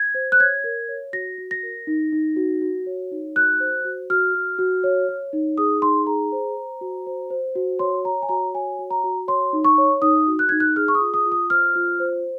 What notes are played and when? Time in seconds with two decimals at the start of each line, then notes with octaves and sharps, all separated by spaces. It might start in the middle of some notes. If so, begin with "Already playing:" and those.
Already playing: G#6
0.15 C5
0.32 F#6
0.40 C#5 G#6
0.64 A#4
0.88 C#5
1.13 F#4 A#6
1.38 F#4
1.51 A#6
1.63 A#4
1.87 D#4
2.12 D#4
2.36 F#4
2.62 F#4
2.87 C#5
3.11 D#4
3.35 F#4 F#6
3.60 C5
3.85 F#4
4.10 F#4 F6
4.34 F#4
4.59 F#4
4.84 C#5
5.09 C#5
5.33 D#4
5.58 G#4 D#6
5.82 D#4 C6
6.07 G#4 A#5
6.32 C5
6.57 C5
6.81 F#4
7.07 C5
7.30 C5
7.55 F#4
7.79 C#5 C6
8.04 C#5 A#5
8.22 G#5
8.29 F#4 A#5
8.54 C#5 G#5
8.79 F#4
8.91 A#5
9.04 F#4
9.28 C#5 C6
9.53 D#4
9.64 C#6
9.78 C#5
10.02 D#4 D#6
10.27 F#4
10.39 F#6
10.49 D#4 G#6
10.60 F#6
10.76 G#4 F6
10.88 C#6
10.95 D#6
11.00 F4
11.14 D#6
11.26 F4
11.32 D#6
11.50 C5 F6
11.75 F4
12.00 C5